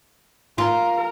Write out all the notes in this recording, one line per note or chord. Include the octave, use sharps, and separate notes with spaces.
F4 A#4